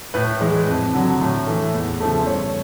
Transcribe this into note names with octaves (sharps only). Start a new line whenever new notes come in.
A2 B4
E3 G#3
F2
D3 F#3
A2
E3 A3
E2
C#3 F3 A3
C5
G2 C#5